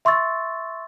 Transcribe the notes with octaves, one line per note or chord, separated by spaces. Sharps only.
E5 C6 C#6 E6 A6